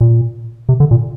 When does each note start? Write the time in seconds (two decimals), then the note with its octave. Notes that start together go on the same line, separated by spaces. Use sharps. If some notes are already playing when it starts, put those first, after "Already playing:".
0.01 A#2
0.69 C3
0.80 D3
0.91 A#2